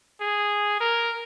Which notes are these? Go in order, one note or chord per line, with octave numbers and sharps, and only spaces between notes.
G#4
A#4